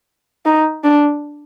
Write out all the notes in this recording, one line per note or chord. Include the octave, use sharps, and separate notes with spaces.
D#4
D4